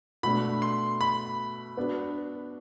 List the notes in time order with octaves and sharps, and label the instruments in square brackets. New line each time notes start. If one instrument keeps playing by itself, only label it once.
[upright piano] B2 A3 D4 [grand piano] B5
[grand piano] C6
B5
[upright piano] B3 D4 F#4